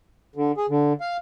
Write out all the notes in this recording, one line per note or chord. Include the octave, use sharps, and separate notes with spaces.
D3
G#4
D3
F5